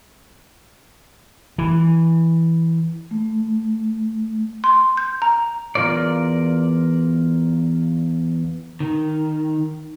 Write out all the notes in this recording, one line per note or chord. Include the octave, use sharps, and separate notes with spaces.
E3
A3
C6
G6
A#5
E2 E3 F4 A#4 D5
D#3